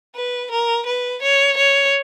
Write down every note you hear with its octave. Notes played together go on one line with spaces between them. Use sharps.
B4
A#4
B4
C#5
C#5